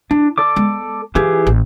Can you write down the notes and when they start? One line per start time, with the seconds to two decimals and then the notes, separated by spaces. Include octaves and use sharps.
0.11 D4 E4
0.38 A4 D5 D6
0.56 G#3 B3
1.15 E3 E4 F4 G4 G#4
1.47 A1